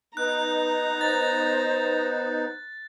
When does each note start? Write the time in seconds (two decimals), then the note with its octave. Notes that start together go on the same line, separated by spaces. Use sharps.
0.17 B3 D#4 A#5 F#6
1.01 C5 A6